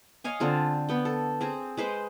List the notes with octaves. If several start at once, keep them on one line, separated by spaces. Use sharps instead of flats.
C#5 D#5 F5 G#5
D3 C4 F4
B3 G5
A4
C4 G#4
G#3 B4 C5